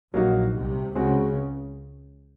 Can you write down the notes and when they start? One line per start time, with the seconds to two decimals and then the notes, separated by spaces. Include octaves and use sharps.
0.14 A#1 A#2 F#3 A#3 D#4 F#4
0.55 C2 C3
0.95 C#2 C#3 G#3 C4 F#4